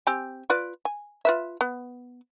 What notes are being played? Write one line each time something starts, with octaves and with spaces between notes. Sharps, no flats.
C4 G4 G#5
F4 B4 D5
G#5
F4 B4 E5
B3